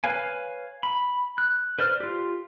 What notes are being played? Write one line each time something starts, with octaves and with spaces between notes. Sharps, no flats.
B4 C#5 F5 G#5
B5
F#6
B4 C5 D5 F6
F4 G4